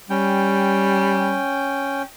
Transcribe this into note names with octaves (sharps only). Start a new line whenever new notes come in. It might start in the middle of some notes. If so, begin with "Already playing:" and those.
G3 C#4 G5